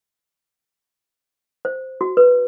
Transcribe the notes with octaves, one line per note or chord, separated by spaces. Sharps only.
C5
F#4
B4